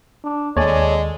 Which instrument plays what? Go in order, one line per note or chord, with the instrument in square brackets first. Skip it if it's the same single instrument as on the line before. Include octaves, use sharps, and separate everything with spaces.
[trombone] D4
[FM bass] D#2 [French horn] G#3 [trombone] A4 [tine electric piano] C#5 D5 G#5